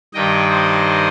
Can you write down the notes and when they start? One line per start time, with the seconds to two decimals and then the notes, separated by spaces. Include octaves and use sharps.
0.14 G2 D#3 G3 D#5 G5
0.50 C5 D#5